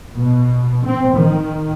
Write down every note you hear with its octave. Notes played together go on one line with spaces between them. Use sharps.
B2
C4
D#3